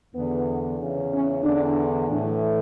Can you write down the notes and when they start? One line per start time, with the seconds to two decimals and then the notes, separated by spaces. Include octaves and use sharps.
0.15 E2 D3 B3
0.79 E2 C#3 E3
1.11 C#4
1.43 E2 D3 D4
2.08 A2 E3 D4